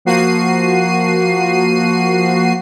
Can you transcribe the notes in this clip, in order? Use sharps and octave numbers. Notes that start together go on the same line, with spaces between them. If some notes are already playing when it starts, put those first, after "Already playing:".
F3 A#3 F#4 C7 D#7